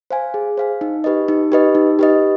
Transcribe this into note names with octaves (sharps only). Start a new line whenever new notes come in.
C5 F5 G#5
G#4
C5 F5 G#5
D#4
G4 B4 D#5
D#4
G4 B4 D#5
D#4
G4 B4 D#5